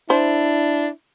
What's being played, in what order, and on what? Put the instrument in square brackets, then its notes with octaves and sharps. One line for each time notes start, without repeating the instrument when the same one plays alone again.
[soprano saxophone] D4 [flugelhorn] E4 [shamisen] C5